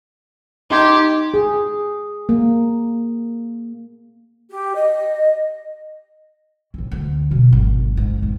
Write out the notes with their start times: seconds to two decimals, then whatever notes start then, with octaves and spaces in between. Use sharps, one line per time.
0.70 D#4 G4 C6 G#6
1.34 G#4
2.29 A#3
4.50 G4
4.75 D#5
6.74 A1 E3
6.92 D2
7.31 B2 C#4
7.51 G#1 F#2
7.97 G#2
8.19 G#1 E2